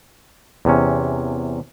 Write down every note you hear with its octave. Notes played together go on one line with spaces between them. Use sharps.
E2 C3 C#4